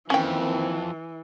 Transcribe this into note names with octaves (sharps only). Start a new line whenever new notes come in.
F2 D#3 E3 A#3 C4 C#4 G5